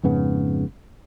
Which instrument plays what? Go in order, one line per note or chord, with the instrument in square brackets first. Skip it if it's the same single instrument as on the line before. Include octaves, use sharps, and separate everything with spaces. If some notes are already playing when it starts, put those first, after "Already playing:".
[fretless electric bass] F2 G#2 C#3 B3